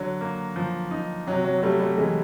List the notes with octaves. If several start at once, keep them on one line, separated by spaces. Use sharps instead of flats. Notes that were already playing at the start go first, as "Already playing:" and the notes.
Already playing: D3 F#3
A#3
F3
D#4
C3 F#3
F#3
F#3
G3 A3
G3
E3 G#3